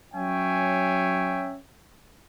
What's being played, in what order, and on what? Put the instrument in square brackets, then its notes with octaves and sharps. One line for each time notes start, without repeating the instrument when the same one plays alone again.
[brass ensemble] F#3 C#4 C#5 E5 G5 G#5